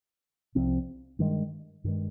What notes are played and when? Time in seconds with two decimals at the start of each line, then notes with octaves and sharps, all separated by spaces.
0.55 C2 C3 F3 C4
1.19 G2 D#3 G#3
1.84 G2 D#3 G#3